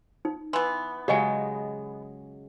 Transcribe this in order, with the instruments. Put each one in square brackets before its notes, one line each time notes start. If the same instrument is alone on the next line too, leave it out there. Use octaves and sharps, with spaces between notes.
[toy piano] D#4
[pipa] E3 B3 [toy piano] C6
[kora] C#3 F#3 G#3 [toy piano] G4 D#5 G#5